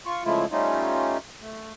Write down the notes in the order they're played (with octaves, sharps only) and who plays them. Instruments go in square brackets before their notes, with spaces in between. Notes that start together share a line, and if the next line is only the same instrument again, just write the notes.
[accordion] F4 C#6
C#3 F3 G#3 A3 E4 F4
G3 A3 C#4 D#4 F4
A3